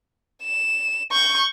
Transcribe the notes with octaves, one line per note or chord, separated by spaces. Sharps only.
E7
C#6 G6